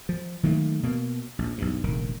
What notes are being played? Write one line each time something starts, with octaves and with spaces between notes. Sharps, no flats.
F3
D#3 F#3 A3 A#3
B2 A#3
A#1
B1 G2
F1 A#1 D#3